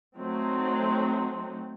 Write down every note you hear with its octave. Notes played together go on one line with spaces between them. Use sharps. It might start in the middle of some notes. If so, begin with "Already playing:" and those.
F#3 A3 C4 D#4